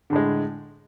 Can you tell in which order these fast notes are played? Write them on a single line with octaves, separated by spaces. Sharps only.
D3 A2 G#3